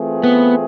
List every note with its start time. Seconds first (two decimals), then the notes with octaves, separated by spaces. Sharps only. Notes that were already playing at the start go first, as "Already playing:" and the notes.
Already playing: E3 A3 C4 F4 G#4
0.24 B3